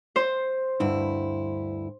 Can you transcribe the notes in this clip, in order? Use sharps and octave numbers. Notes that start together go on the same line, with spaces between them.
C5
D2 G2 E4